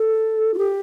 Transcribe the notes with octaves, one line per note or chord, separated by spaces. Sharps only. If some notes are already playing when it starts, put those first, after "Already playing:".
Already playing: A4
F4
G4